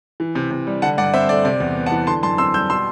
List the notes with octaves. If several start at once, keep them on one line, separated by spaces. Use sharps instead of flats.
E3
C3
C3
G3
D3 F#5 A5
G2 D5 F#5
C4 C5 E5
A3 D5
C3 D5
E2
B3
F#5 A5
E3
D3 A5 C6
F#2 A5 C6
C4 C6 E6
G3 E6 G6
B2 C6 E6